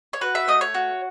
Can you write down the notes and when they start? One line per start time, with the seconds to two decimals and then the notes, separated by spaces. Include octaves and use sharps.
0.13 C#5
0.21 F#4 B4
0.35 E5
0.48 A3 D#5
0.61 C#5
0.74 F#4